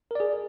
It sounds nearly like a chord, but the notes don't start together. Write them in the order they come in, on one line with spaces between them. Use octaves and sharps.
A#4 D5 G#4